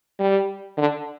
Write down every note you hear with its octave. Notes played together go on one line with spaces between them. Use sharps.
G3
D3